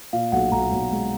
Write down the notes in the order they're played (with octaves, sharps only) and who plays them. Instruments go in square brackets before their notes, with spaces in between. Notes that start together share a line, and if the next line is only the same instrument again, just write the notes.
[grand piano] A#2 [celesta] F5
[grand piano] B1 [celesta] F#5
[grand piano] B1 [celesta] A#5
[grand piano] B1
G#3